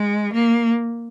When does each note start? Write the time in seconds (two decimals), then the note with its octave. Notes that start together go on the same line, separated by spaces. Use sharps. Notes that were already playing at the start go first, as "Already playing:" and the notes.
Already playing: G#3
0.34 A#3